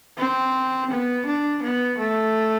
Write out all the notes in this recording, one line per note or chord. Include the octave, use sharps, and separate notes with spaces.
C4
B3
D4
B3
A3